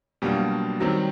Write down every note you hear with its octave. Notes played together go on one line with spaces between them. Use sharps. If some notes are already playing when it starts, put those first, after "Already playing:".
B2 F#3 G3 A#3 D4 F4
D#3 F#3 G3 C4 D#4